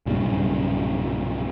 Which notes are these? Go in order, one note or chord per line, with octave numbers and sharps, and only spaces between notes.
B1 G2 A#2 C#3